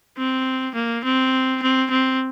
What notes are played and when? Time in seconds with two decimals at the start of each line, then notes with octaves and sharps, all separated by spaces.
0.18 C4
0.75 A#3
1.05 C4
1.63 C4
1.91 C4